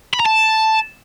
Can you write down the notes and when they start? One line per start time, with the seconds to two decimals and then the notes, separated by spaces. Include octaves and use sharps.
0.14 B5
0.20 A#5
0.26 A5